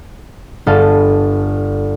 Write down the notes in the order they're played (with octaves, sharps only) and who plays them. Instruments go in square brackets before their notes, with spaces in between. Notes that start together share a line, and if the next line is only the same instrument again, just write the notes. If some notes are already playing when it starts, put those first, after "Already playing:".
[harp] G1 A4 F5